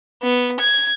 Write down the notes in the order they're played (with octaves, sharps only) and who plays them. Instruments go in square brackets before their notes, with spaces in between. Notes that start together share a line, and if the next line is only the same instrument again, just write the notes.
[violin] B3
G#6